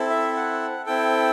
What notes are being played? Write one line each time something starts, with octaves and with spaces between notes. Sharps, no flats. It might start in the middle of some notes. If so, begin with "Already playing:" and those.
Already playing: C4 E4 A4
E5
F#5
C4 E4 A4 G5